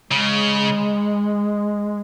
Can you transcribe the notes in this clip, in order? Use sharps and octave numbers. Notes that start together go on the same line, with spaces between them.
C#3 G#3